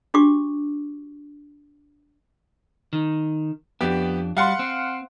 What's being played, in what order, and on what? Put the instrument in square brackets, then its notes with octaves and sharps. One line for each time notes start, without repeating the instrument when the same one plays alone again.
[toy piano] D4 F#4 G4 C#6 D6
[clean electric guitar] D#3
[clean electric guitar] F2 D4 [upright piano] B3 G4
[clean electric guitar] G3 [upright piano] F5 F#5 C6
[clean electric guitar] C4